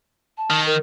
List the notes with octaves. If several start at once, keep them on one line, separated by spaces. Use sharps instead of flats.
A5
D#3
A#4